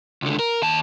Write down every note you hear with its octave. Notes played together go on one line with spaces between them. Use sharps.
C#2 D3
A#4
D#2 A5